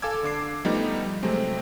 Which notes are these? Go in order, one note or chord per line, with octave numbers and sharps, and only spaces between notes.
A4 F5 G#5 D6 E6 G#6
D3 D4 D6 C7
F3 G3 A3 B3 D#4
C3 F#3 G#3 A3 C4